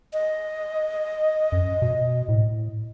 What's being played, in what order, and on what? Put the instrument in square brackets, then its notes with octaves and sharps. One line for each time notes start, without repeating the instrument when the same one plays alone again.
[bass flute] D#5
[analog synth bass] F#2
B2
A2